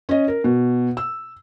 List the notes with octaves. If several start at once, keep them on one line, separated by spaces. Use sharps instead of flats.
C#4 D#5
A#4
B2
E6